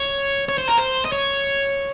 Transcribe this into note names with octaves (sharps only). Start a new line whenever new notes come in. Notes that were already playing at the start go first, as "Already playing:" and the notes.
Already playing: C#5
C#5
C5
A#4
C5
D#5
C#5